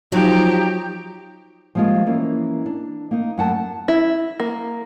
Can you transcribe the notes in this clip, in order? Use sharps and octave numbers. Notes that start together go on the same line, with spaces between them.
F3 F#3 D#4 G4
F3 G3 G#3 A#3 F4
E3 A#3 C#4
D4
A#3 D#4
F#2 A3 F#5 G5 A5
E4
A#3